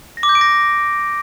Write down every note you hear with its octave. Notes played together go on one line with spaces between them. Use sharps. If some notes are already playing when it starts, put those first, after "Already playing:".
A#6
D6
G6
D7
A#6